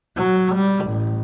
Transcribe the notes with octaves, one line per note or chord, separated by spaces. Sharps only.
F#3
G3
A1